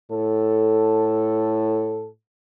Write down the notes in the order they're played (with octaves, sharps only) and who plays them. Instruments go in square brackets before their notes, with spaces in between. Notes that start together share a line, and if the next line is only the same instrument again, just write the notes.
[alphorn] A2 [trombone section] A4